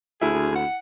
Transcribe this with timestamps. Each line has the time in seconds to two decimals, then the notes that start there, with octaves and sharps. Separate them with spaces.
0.21 D2 E4 G#4
0.56 F#5